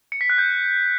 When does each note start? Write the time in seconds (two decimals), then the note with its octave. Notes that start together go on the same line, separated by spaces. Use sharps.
0.12 C#7
0.21 B6
0.30 F#6
0.38 G6